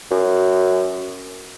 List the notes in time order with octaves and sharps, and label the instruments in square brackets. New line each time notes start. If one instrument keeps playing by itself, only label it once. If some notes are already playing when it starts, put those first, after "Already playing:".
[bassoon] F#2